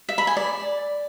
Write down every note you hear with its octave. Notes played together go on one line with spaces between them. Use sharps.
E5
B5
G#5
D5